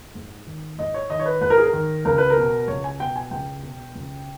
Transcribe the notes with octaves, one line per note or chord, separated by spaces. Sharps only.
G#2
D#3
G#2 D#5
C#5
D#3 D#5
C#5
B4
G#2 B4
A#4
G#4
A#4
D#3
C#2 A#4
B4
A#4
B2
C#2 C#5
G#5
B2 G5
G#5
C#2 G5
B2
C#2